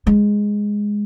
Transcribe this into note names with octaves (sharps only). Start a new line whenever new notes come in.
G#3